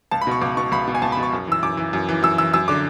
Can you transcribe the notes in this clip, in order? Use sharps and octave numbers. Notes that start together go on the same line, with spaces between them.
C#2 A5
B5
B2 C#6
C#2 D6
B2 C#6
C#2 B5
B2
G#5
C#2 A5
B5
B2
C#6
F#2
E3 E6
F#2 D6
E3
F#2
E3
F#2 E6
E3 E6
F#2 E6
D3 D6